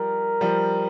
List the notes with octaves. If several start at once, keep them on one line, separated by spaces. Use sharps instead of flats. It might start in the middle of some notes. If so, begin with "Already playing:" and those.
Already playing: F3 G3 A#4
F3 G3